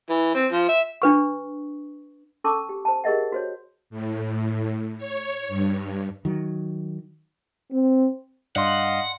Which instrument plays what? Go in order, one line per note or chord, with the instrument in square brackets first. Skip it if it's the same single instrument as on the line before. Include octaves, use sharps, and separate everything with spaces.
[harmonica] E3
C4
F3
E5
[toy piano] D4 B4 C#6
C#4 A4 A5 C#6 D6 E6
G4
C5 A5
G4 G#4 A#4 D#5 E5 F#5
F#4 C5 C#5
[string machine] A2
C#5
G2
[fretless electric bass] D#3 F#3
[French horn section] C4
[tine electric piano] G2 [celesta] D5 C6 [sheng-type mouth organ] D#5 F5 [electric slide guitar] F#5